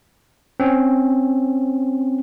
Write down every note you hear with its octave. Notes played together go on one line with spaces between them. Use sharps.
C4 C#4